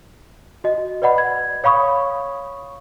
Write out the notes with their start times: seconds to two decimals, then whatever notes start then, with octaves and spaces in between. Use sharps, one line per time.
0.64 F#4 D#5
1.02 B4 D5 D#5 F#5 B5
1.18 G#6
1.64 C#5 F5 B5 C#6 D#6